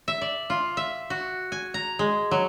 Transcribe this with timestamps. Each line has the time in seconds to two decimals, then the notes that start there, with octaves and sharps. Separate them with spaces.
0.08 E5
0.21 D5
0.50 F4
0.77 E5
1.10 F#4
1.52 G#5
1.74 A#5
1.99 G#3
2.31 F#3